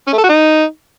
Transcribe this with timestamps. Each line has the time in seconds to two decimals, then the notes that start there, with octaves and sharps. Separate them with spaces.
0.07 C#4
0.13 A3
0.18 A4
0.24 F#4
0.29 D#4